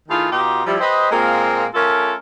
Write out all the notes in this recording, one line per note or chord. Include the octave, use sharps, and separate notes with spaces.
D#3 A3 E4 F4 G#4
B2 D#4 F4 G4
F3 G3 E4
G4 B4 C5 D#5
A#2 G#3 A#3 C4 F4 A#4
A3 C#4 F4 A4 A#4